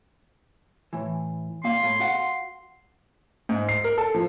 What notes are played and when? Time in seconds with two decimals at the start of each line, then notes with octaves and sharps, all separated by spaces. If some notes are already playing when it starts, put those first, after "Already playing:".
0.93 A2 E3
1.64 A#2 A#3 F5 C6
1.83 A2
2.00 F#4 F5 F#5
3.49 G#2
3.69 C7
3.84 A#4
3.98 A4
4.14 F3